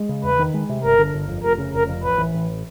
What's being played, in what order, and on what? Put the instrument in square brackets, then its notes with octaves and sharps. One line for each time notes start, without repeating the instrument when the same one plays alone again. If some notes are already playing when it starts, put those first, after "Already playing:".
Already playing: [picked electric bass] G#3
C#3
[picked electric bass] E2 [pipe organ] B4
[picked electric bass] D#3
G#3
C3
[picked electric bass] G1 [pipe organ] A#4
[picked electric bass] D3
G1
F2
[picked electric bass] F1 [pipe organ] A#4
[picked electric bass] C#3
[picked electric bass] F1 [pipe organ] A#4
[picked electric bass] F2
[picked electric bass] A1 [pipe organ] B4
[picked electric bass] E3
A1